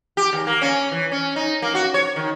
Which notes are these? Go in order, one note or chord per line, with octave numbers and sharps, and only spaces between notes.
G4
D#2
A#3
C#4
E3
C#4
D#4
A#3
F#4
C#5
D#3